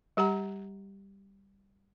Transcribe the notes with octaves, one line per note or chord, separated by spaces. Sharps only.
G3 G4 F#5 A#5